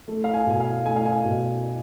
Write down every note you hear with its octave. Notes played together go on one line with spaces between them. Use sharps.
A3
F5
G#5
B2 G#5
F5
A3 G#5
F5
G#5
B2